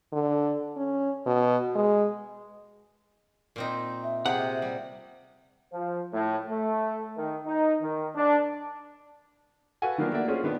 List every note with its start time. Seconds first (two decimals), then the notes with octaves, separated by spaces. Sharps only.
0.12 D3
0.77 C#4
1.26 B2
1.76 G#3
3.56 A#2 C4 D#4
4.04 E5
4.26 C3 G4 G#4 F#5
4.62 G3
5.73 F3
6.13 A2
6.49 A3
7.17 D#3
7.46 D#4
7.82 D#3
8.15 D4
9.82 F#4 A4 B4 F5 F#5 G#5
9.98 D#3 F3 F#3 A#3 B3 D4
10.12 A3 A#3 D5 E5 F#5
10.28 C#4 F4 G#4 C5
10.44 D#3 B3 D4